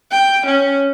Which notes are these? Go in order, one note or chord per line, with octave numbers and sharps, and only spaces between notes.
G5
C#4